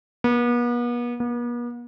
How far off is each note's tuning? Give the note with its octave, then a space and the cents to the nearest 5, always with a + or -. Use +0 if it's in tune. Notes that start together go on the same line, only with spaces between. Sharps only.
B3 -40
B3 -45